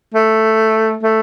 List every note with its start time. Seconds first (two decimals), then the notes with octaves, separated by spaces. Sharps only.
0.14 A3
1.03 A3